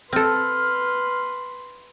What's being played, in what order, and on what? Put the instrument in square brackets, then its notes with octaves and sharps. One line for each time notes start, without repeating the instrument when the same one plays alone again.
[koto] C4 A4 [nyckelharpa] B4 C6 [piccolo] F6